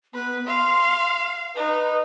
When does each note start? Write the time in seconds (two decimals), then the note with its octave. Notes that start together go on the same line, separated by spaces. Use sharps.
0.14 B3 B4
0.47 F5 C6
1.55 D#4 B4